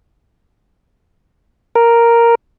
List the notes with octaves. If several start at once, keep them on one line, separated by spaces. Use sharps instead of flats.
A#4